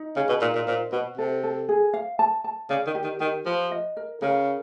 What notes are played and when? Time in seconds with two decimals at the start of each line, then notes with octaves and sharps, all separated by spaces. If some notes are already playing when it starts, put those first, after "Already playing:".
Already playing: D#4
0.16 C#3 G#4
0.29 B2
0.41 A#2 D#4
0.55 A#2
0.67 A#2 C5
0.92 B2 F#4
1.18 C3 A4
1.44 A4
1.69 G#4
1.94 F5
2.19 A5
2.44 A5
2.70 C#3 D5
2.87 D#3
2.95 G4
3.04 D#3
3.20 D#3 G4
3.46 F3 B4
3.71 D#5
3.97 A#4
4.22 C#3 A#4